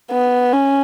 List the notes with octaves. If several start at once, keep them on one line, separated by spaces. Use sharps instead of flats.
B3
C#4